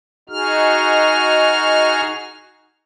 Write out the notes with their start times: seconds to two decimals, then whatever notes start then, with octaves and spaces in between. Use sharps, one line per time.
0.29 D#4 F#4 G#4 F6